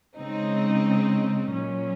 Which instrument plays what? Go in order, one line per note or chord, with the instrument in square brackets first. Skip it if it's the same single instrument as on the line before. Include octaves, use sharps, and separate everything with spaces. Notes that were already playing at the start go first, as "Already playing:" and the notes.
[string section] C#3 G#3 C4 D#4
A#2 F#3 C#4